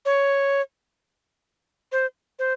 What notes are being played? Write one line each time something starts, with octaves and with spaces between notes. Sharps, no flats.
C#5
C5
C5